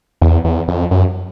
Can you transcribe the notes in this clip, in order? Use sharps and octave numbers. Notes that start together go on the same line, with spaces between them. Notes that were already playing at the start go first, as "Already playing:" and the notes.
E2
E2
F2
F#2